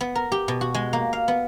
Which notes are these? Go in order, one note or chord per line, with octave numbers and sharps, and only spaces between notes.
B3
A#4
G4
B2
F#4
G#3
A#3
F5
B3